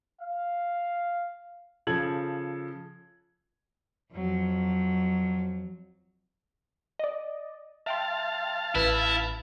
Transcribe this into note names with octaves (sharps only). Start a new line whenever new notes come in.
F5
C#3 F3 A4 G#6 F#7
F2 F#3
D5 D#5
E5 F5 G5 A5 C6
A1 E4 B4